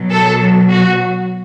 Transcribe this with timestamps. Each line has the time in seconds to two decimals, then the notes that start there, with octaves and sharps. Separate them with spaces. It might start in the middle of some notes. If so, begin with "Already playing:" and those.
Already playing: B2 F#3
0.11 A4
0.70 F#4